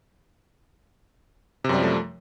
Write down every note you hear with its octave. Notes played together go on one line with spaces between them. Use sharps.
F#2 C3 F3 G3 A3